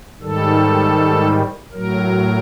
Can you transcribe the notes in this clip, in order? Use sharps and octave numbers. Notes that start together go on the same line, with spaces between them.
G#2 D#3 G3 A4
A2 F#3 A#4